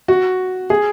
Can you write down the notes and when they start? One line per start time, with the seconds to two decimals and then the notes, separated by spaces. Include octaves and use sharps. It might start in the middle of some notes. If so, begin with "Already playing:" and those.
0.08 F#4
0.70 G#4